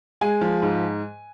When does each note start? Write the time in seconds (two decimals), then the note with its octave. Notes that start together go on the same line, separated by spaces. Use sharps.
0.21 G#3 G#5
0.41 F3
0.62 G#2